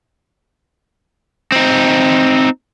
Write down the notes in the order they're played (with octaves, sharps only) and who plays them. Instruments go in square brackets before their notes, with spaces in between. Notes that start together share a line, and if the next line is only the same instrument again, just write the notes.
[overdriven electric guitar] C4 D#4